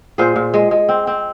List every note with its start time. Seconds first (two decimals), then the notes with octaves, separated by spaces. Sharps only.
0.18 A#2 G#4 C5
0.36 A#2
0.54 G#3
0.71 G#3
0.89 C4
1.07 C4